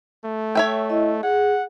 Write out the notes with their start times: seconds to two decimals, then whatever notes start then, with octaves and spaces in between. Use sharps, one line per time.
0.25 A3
0.55 C#5 E5 G5
0.90 E4 D#5
1.23 G#4 F#5